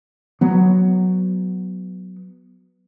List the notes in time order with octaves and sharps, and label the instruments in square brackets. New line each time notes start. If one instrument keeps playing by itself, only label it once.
[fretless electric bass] F#3 B3